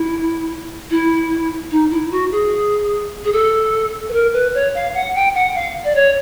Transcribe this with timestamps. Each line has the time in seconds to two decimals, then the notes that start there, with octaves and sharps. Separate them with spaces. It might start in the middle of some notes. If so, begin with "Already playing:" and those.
Already playing: E4
0.90 E4
1.71 D#4
1.91 E4
2.11 F#4
2.32 G#4
3.24 G#4
3.33 A4
4.09 B4
4.13 A#4
4.33 B4
4.54 C#5
4.74 F5
4.94 F#5
5.15 G5
5.34 F#5
5.55 F5
5.84 D5
5.95 C#5